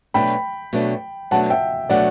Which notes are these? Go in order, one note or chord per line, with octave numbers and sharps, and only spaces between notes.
B2 F#3 A3 D4 G5 B5
B2 F#3 A3 D4
B2 F#3 A3 D4 F#5 A5
E5 G5
B2 F#3 A3 D4 D5 F#5